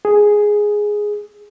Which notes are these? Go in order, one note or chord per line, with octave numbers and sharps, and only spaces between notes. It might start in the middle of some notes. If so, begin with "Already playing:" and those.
G#4